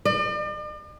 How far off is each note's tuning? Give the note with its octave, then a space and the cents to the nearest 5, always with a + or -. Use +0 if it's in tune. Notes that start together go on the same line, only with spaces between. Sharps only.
D5 +45